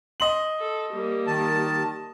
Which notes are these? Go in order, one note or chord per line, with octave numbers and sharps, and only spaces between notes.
D#5 C6 F#7
A4
G3 A#3
D#3 A5